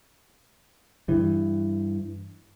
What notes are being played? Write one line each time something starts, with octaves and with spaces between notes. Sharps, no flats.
G2 E3